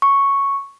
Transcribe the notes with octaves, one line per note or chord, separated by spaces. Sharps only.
C#6